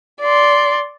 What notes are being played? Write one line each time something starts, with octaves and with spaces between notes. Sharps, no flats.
D5 C6